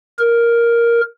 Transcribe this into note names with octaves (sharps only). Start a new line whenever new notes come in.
A#4